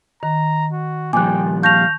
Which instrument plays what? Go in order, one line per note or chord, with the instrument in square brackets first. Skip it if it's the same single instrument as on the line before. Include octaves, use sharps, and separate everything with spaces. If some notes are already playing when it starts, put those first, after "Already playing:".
[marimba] D#3 [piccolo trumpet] A#5
[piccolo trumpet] F#4
[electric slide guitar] A#2 F3 G3 [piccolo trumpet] G5 [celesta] G#5 F#6 [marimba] D6
[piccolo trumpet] F5 [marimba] A5 C#6 [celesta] G6 A#6 F7